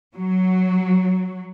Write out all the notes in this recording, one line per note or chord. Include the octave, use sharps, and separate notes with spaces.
F#3